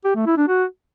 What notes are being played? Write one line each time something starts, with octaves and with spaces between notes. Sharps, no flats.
G4
A3
E4
D4
F#4